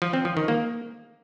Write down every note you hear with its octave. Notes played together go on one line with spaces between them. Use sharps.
F3
C4
F3
D#3
A#3